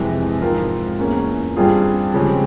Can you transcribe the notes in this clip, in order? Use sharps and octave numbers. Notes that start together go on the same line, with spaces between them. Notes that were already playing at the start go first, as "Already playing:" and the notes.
Already playing: F2 C3 E3 G#3
G#2 F3 C4 F4 A#4
E2 E3 A#3 C#4
G2 G3 C4 F4 G#4
C#3 F3 G#3 C4 G4